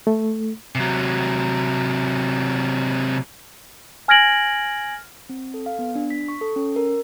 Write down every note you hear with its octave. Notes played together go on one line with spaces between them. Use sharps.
A3
C3 F#3
G#5 F6 G#6 A#6 D7 F#7
C4
A4
F5
B3
D4
B6
C#6
A4
C#4
A#4